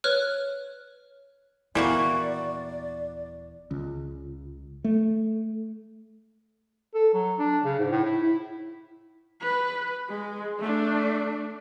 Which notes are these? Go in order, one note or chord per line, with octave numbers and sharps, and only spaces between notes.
B4 C#5 F6 F#6
D#1 E3 G3 A#3 B3 F#4 A#4 D5
C#2
A3
A4
F#3
D4
C#3
G#2
A2
E4
E4
B4
G#3
A3 D4